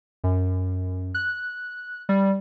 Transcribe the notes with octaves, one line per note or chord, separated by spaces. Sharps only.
F#2
F#6
G3